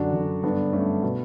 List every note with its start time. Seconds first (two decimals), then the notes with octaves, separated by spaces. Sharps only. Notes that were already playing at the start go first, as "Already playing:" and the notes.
Already playing: F#2 D3 D4 F#4
0.13 F#2 D3
0.43 G2 D3 B3 D4
0.73 G2 D3 A3 C#4
1.03 B2 B3